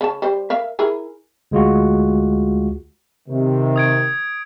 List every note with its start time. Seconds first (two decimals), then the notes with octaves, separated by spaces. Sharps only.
0.01 C#3 A5
0.22 G3 C5
0.50 A#4 E5 F5
0.79 E4 G#4 A#4
1.51 D2 G#3 F4 F#4
3.28 C3 D#3
3.76 D#6 G#6 D7